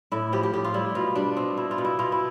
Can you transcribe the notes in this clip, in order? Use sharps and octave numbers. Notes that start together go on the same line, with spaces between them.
A2 E4
F3 G4
G4
A2 G4
F4
G3 E4
B2 F4
G3 D4
B2 C4
B2 E4
F4
B2
E4
B2 F4
E4